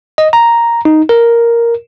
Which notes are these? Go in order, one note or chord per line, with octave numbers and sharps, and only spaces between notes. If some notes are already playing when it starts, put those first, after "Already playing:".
D#5
A#5
D#4
A#4